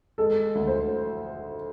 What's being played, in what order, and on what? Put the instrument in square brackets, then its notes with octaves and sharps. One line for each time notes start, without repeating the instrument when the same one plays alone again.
[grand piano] G#3 [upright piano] A4
[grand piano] D2
[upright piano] C5